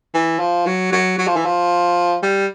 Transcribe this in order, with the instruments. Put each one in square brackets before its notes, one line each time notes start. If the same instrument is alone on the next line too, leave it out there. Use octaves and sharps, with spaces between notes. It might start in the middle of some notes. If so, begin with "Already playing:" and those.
[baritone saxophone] E3
F3
F#3
F#3
F#3
F3
E3
F3
G3